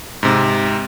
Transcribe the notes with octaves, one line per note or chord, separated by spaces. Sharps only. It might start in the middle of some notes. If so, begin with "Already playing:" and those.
G#2 C3